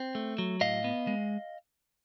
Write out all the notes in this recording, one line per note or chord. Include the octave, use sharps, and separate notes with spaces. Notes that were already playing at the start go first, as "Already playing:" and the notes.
Already playing: C4
A3
F#3
A2 D#5 F5
B3
G#3